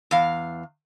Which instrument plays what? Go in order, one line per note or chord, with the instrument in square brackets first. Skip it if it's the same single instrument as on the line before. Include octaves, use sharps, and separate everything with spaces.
[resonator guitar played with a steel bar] E2 F5